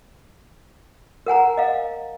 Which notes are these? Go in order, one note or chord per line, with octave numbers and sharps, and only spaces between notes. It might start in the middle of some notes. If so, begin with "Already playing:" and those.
A#4 F#5 G#5 A#5
D#5 F5